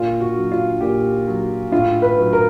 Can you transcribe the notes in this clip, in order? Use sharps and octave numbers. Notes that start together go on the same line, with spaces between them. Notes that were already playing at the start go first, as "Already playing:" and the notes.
Already playing: A#2 F4
F#4
F#3
F4
A#2 G4
F#3
A2 F4
B4
F#3
A#4